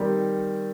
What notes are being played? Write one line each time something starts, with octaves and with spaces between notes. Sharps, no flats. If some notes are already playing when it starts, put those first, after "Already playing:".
Already playing: D#3 G3 C4